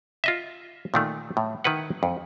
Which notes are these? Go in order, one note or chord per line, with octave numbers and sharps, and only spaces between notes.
F4 D#5 E5
A#2 D#3 A3
A2
D#3 E4 B4 F#5
F2